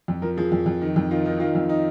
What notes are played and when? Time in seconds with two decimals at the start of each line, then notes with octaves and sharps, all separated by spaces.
0.08 F2
0.22 F3 A#4
0.37 F3 G#4
0.52 F2
0.66 F2
0.81 D#3
0.96 F2
1.11 D#3 F4
1.25 D#3 D#4
1.40 D#3 F4
1.55 F2
1.69 D#4